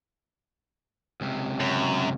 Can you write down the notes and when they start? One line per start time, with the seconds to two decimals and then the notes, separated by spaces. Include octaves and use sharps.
1.21 C#2 C3
1.60 F#2